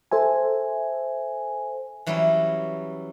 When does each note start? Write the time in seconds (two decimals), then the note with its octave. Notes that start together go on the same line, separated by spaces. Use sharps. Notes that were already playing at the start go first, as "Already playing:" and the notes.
0.12 A4 C5 E5 G#5
2.06 E3 F#3 G3 C#4 E4